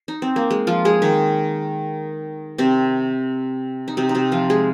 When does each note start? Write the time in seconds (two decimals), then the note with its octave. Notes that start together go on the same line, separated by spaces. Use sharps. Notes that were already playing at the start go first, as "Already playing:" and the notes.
Already playing: F4
0.08 D#4
0.22 C4
0.36 A#3
0.50 G#3
0.67 F3 F4
0.85 G#3 G#4
1.02 D#3 D#4
2.58 C3 C4
3.88 D#4
3.97 C3 C4
4.09 D#4
4.15 C3 C4
4.32 F3 F4
4.50 G#3 G#4